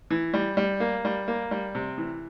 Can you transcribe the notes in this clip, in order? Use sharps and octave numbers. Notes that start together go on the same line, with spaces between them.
E3
G3
G3
A#3
G3
A#3
G3
C3
E3